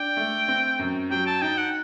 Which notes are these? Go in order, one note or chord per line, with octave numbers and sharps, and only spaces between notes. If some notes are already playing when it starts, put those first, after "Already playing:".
Already playing: D4 G5
A3
C4
F#2
F#3 G5
A5
D#4 G5
F#5